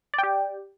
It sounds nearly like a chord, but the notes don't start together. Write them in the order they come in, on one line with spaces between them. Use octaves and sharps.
D5 G5 G4